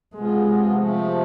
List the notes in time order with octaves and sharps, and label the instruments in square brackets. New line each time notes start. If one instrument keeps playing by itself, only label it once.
[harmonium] C3 F3 B3 F4 [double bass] G#3
[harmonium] C3 F3 A3